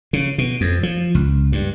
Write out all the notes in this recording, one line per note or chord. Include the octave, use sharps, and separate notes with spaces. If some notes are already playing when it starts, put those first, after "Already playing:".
C#3
B2
F2
F3
C#2
G2